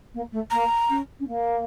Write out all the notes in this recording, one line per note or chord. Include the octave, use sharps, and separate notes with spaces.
A#3
A3
A#3 A#5
C#4
C#4
A#3